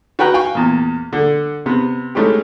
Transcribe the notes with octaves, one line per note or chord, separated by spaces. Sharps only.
F#4 B4 G5 A#5 F#6
F5 G5 G#5 C#6
E2 A#2
D3
C3 B3
G#3 A3 C#4 D#4 E4 G4